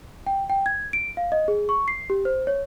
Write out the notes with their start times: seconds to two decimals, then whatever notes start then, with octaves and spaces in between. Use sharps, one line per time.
0.27 G5
0.50 G5
0.66 G#6
0.93 D7
1.17 F5
1.32 D#5
1.48 G#4
1.69 C#6
1.88 C7
2.10 G4
2.25 C5
2.47 C#5